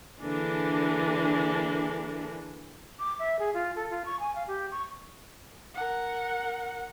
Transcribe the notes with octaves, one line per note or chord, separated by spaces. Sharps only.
D3 E3 A#3 D4 G#4 A4
D6
E5
G#4
F4
A4
F4
C#6
G#5
F5
G4
C#6
A#4 F#5